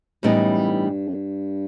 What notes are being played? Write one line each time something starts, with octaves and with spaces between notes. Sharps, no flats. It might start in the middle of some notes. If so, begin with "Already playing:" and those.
F#2 A2 E3 G3 B3 D#4
G2
F#2
G2